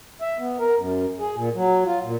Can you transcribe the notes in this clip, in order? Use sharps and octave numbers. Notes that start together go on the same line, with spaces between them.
E5
B3
A#4
F#2
G#4
A#2
F#3
F4
A#2